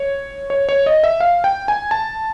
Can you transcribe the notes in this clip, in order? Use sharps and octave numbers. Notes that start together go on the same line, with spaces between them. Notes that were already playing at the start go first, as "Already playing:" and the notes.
Already playing: C#5
C#5
C#5
D#5
E5
F5
G5
G#5
A5